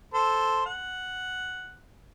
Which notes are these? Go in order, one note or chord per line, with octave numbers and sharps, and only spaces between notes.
A4 C5
F#5